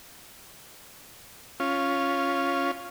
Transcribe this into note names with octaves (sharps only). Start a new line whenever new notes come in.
C#4 F4